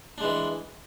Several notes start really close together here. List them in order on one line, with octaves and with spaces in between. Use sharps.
D4 G#3 E3